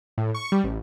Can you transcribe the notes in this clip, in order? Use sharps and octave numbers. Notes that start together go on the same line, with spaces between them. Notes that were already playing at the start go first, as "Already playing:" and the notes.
A2
C#6
G3
A1